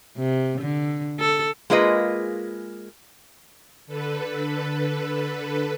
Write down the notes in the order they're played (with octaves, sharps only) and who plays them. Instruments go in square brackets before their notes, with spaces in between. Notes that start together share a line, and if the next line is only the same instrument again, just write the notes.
[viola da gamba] C3
D3
A4
[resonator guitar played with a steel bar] G#3 A#3 F4 G#4 B4 D#5
[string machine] D3 A4 B4